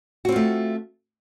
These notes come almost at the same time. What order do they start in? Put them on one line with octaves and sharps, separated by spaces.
F#4 C4 F4 A3